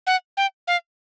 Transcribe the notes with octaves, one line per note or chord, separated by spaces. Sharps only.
F#5
G5
F5